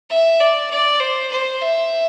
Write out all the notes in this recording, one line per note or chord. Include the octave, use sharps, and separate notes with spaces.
E5
D5
D5
C5
C5
E5